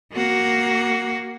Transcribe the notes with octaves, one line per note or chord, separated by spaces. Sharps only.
A#3 F#4